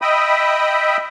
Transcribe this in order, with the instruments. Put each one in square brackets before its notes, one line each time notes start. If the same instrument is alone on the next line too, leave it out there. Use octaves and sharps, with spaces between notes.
[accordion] D#5 E5 G5 B5 D#6